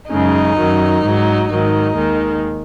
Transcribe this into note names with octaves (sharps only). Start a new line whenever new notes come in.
F#2 C#3 G#3 D#4
F#2 D#3 F#3
G#2 F#3
G#2 D#3 F#3 D#4
D#2 D#3 G#3